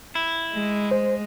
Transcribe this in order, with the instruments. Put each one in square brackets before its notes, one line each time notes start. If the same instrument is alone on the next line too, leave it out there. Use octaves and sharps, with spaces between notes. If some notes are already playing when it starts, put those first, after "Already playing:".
[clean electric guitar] E4
[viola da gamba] G#3
[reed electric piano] C5